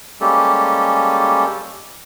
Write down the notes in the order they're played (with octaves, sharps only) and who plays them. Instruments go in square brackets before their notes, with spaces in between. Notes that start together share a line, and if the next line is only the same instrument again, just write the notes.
[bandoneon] G3 G#3 A#3 C#4 G4 A4